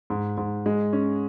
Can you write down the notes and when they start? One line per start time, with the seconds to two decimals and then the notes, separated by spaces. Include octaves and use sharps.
0.10 G#2
0.37 G#2
0.66 G#3
0.93 C#4